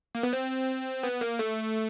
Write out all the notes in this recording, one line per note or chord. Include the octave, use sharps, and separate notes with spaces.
A#3
B3
C4
B3
A#3
A3